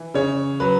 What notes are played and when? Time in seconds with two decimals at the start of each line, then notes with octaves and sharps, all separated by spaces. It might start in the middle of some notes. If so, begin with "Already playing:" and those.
Already playing: E3
0.14 C#3 C#5
0.60 F#3 B4